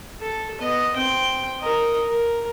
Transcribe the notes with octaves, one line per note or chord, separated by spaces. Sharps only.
A4
B3 D#5
C4 G5
A#4 D#5
A#4